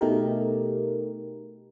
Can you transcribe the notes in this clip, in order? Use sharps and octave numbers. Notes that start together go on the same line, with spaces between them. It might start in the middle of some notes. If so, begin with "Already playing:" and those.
B2 A3 D#4 G4 A4 A#4